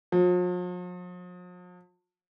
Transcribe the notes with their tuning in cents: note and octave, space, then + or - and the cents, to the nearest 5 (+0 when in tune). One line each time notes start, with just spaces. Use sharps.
F3 +45